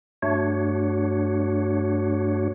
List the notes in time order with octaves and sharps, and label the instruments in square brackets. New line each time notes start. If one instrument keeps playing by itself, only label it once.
[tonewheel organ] G2 A3 D4 F#4 C#5